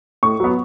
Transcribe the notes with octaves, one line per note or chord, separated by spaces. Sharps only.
A2 C#6
F#3 B3